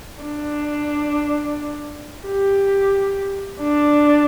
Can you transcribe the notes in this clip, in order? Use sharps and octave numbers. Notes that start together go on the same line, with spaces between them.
D4
G4
D4